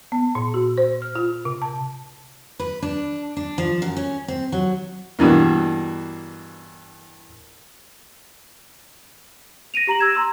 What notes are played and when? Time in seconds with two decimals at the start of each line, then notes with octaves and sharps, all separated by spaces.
0.12 B3
0.35 A#2
0.54 F#4
0.78 C5
1.02 F6
1.16 F4
1.45 C3
1.62 A5
2.60 B4
2.82 D4
3.37 D4
3.58 F3
3.82 F#2
3.97 C#4
4.28 C4
4.52 F#3
5.19 G2 B2 E3 A#3
9.74 A#6 D7 D#7 F7
9.87 G4 A#5 A#6 F#7
9.99 E6 G#6 E7
10.15 A#5 C6 E6